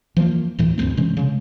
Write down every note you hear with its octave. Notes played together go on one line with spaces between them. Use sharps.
E3 F3 A3 A#3
D2 A2 E3
D2 G2 A3 C4
C3 E3 G#3 C#4
C#3 G#3